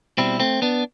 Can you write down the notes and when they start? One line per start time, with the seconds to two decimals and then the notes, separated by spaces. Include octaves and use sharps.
0.17 B2 G3 C4 E4
0.40 A3 C4
0.62 B3 D4